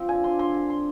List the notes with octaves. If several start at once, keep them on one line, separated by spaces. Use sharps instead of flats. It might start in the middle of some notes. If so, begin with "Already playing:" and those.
Already playing: F3 C4
D3 G#5
D4 C6
D3 C6
D3
C6